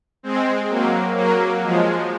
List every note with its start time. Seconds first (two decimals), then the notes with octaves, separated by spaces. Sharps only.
0.23 G#3 C4
0.69 F#3 A#3
1.16 F#3 A#3
1.62 F3 G#3